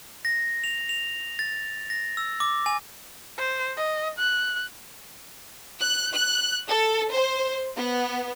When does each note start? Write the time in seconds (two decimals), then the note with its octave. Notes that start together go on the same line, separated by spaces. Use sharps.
0.25 A#6
0.64 F7
0.89 F7
1.39 A6
1.90 A#6
2.17 E6
2.40 D6
2.66 G#5
3.38 C5
3.77 D#5
4.18 F#6
5.81 F#6
6.13 F#6
6.69 A4
7.11 C5
7.78 B3